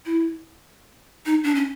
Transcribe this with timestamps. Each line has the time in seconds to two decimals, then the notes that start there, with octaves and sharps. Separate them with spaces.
0.06 E4
1.26 D#4
1.44 D4
1.55 C#4